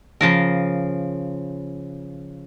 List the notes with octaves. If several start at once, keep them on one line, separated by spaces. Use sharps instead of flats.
C#3 F3 A#4